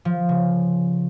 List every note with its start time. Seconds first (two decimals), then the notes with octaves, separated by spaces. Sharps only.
0.05 F3
0.29 C#3